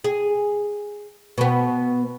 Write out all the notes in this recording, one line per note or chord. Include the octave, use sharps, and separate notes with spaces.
G#4
B2 B3